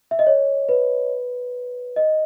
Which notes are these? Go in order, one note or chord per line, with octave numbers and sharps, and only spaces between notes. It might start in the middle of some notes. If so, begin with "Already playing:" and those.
E5
D#5
C#5
B4
D#5